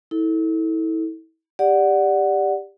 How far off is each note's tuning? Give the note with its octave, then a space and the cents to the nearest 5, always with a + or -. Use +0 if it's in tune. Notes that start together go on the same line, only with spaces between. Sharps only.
E4 -35 A4 +0
G4 +15 D5 +0 F#5 +0